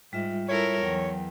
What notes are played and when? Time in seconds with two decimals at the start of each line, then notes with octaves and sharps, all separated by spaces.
0.13 G#2 G3 F4 E5
0.48 E4 A4 A#4 C#5
0.82 E2 F#3 G5